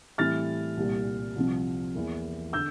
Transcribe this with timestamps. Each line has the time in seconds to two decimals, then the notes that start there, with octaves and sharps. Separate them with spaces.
0.18 A2 E3 G3 C4 F6 A6
0.77 C2 A#2 G3
1.36 C2 C3 F3 C4
1.95 E2 E3 A#3
2.53 D3 E6 G6